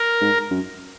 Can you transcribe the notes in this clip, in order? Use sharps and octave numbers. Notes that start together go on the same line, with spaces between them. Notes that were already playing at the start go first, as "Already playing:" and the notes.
Already playing: A#4
G#2
F#2